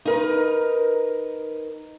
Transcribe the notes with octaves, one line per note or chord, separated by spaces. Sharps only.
D#4 A#4 B4